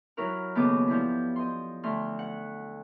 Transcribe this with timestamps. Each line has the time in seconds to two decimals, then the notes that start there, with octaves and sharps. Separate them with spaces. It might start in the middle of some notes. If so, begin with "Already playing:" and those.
0.17 F#3 E4 F#4 A#4
0.55 D#2 C#3 B3 A4 D#5 D6
0.87 F3 G3 E4
1.36 D#5 C6
1.83 D2 A3 C6 F6
2.19 F#5